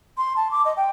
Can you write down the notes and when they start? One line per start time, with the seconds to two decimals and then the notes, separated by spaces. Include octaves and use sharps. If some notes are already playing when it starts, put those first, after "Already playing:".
0.17 C6
0.36 A5
0.51 D6
0.65 D#5
0.77 G5